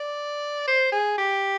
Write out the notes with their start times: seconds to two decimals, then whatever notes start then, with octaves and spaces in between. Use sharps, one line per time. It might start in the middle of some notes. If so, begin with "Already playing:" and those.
Already playing: D5
0.67 C5
0.92 G#4
1.18 G4